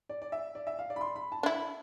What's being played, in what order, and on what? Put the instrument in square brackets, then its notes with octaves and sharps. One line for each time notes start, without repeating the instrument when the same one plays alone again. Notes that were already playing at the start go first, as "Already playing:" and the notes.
[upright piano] D5
D5
E5
D5
E5
F5
D5
B5
C6
B5
A5
[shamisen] D4
[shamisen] E4 [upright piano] B5